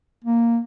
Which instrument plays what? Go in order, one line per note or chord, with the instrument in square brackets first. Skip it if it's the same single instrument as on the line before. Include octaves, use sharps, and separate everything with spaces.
[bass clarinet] A#3